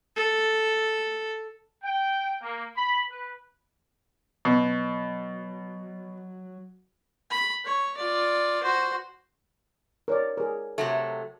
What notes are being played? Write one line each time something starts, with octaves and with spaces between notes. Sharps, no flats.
A4
G5
A#3
B5
B4
B2 F#3
B5
C#5
F4 D5
F#4 C5
A#4 C#5 D5
G#4 A#4
C3 F#3 A3